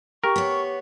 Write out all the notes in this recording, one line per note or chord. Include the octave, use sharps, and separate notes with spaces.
G4 A#4 C#6
B3 C#5